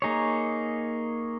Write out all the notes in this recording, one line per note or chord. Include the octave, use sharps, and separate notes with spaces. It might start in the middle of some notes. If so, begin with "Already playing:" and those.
A#3 D#4 G#4 C#5